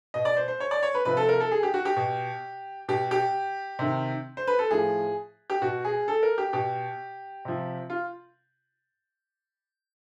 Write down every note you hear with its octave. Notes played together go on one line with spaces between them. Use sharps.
B2 D#5
D5
C5
C5
C#5
D5
C#5
B4
C3 F3 B4
A4
A#4
A4
G#4
G4
F#4
G4
B2
B2 G4
G4
C3 D#3
C5
B4
A4
A2 F3 G#4
G4
B2 F#4
G#4
A4
A#4
G4
B2 G4
C3 F3
F4